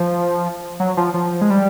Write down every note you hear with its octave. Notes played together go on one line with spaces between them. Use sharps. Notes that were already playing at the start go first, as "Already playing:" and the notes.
Already playing: F3
F#3
F3
F3
G#3
G3